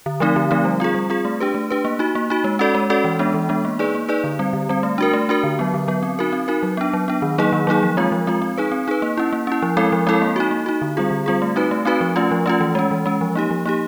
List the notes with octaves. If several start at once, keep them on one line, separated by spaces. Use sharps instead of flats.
D3
F3 A3 C4 D#4
D3
F3 A3 C4 D#4
G3
C4 F4 G#4
G3
C4 F4 G#4
A3
D4 G4 B4
A3
D4 G4 B4
A#3
D#4 F#4
A#3
D#4 F#4
G#3
C#4 F#4 A4 D5
G#3
C#4 F#4 A4 D5
E3
G#3 B3 D4
E3
G#3 B3 D4
A#3
D#4 G#4 B4 D5
A#3
D#4 G#4 B4 D5
D3
G3 C4
D3
G3 C4
A3
D4 F#4 A#4
A3
D4 F#4 A#4
D3
F#3 B3
D3
F#3 B3
C4
D#4 F#4 A#4
C4
D#4 F#4 A#4
F#3
B3 D4
F#3
B3 D4
D#3
F#3 A#3 D#4 G#4
D#3
F#3 A#3 D#4 G#4
F3
G#3 C4 F4
F3
G#3 C4 F4
C4
D#4 G#4 B4
C4
D#4 G#4 B4
A#3
C#4 E4
A#3
C#4 E4
F3
G#3 C4 E4 A4
F3
G#3 C4 E4 A4
A#3
D#4 F#4
A#3
D#4 F#4
D3
G3 C4 F4 G#4
D3
G3 C4 F4 G#4
A3
C4 D#4 F#4 B4
A3
C4 D#4 F#4 B4
F3
A3 C#4 F4
F3
A3 C#4 F4
E3
G#3 C#4
E3
G#3 C#4
F3
A#3 D#4 G4
F3
A#3 D#4 G4